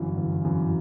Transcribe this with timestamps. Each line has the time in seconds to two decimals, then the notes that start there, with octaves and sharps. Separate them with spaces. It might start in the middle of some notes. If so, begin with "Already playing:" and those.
Already playing: G1 F#2 E3
0.17 G1
0.45 F#2 E3